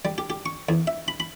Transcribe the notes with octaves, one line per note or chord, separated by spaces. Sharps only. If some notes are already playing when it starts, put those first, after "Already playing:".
G3
G4
G4
C#6
E2
E5
B5
B5